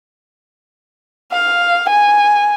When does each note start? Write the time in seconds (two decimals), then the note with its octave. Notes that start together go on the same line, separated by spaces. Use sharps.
1.32 F5
1.90 G#5